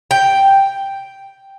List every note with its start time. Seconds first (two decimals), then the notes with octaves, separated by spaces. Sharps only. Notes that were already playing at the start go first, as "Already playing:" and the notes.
0.11 G5